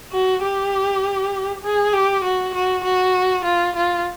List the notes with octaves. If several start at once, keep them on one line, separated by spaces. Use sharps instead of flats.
F#4
G4
G#4
G4
F#4
F#4
F#4
F4
F4